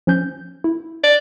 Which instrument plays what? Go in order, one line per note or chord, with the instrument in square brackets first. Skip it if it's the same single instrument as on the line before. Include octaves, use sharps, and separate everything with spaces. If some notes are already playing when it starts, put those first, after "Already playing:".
[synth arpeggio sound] F3 C#4 G6
E4
[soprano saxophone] D5